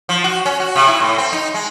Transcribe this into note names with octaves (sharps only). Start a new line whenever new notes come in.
F3
F#4
C#4
F#4
C3
E4
A2
C4
D#4
G#3